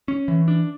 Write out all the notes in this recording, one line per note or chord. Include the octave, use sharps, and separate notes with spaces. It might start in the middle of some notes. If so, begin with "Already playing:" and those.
C#4
E3
D4